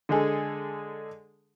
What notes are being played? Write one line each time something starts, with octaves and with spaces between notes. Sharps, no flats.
D3 G#3 G#4 A4